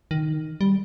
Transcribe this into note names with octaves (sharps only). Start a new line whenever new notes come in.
D#3
G3